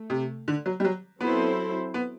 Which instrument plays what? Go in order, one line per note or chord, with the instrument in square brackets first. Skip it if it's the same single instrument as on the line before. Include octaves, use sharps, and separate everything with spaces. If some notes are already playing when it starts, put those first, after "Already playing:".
Already playing: [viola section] A3
[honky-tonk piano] C3
D3
F#3
G3
F#3
[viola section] F#3 C4 E4 A4 C5 [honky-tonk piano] B3
[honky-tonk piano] B3